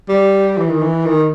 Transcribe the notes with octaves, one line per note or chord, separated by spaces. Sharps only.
G3
E3
D#3
E3
D#3